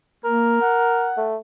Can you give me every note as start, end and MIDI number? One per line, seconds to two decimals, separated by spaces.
0.25 0.57 58
0.25 1.12 70
0.61 1.28 78
1.17 1.36 57